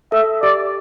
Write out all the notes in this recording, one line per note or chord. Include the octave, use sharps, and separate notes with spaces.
A4 E5
G4 D5